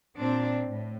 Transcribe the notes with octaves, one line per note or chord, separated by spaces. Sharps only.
A#2 C4 D4
A2